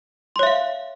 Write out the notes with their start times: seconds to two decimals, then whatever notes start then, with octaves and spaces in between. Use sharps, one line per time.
0.36 C6
0.39 C#5
0.43 E5
0.47 F5